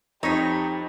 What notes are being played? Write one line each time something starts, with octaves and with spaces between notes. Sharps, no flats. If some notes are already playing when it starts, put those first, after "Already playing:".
F2 C4 D#4 G4 C#5 D#5 B6